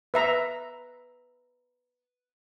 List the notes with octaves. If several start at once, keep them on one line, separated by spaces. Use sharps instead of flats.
B4 E5 A#5